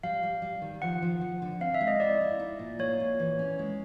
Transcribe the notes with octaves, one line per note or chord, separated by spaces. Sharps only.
G3 F5
G3
G3
D#3
F3 F#5
F3
F3
D3
C4 F5
E5
G#3
D#5
E4 D5
E4
D#4
A#2
A#3 C#5
A#2
E3
C#4
G#3